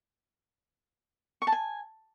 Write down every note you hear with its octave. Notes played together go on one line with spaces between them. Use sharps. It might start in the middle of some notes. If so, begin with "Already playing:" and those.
C#6
A5
G#5